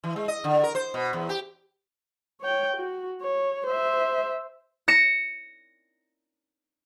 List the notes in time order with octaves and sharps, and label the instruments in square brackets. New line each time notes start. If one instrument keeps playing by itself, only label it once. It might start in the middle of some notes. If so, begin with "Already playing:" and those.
[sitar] E3
G#3
D#5
D3
A#4
C5
B2
E2
G4
[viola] C#5 G5
F#4
C#5
C5 E5
[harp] A#6 C#7 E7